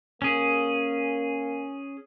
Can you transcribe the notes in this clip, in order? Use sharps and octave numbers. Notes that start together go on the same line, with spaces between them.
A#3 C#4 G#4